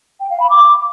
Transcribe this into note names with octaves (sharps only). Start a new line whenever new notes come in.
G5
F5
B5
D6